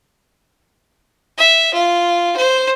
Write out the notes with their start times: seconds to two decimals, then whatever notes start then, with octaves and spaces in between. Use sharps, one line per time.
1.38 E5
1.74 F4
2.36 C5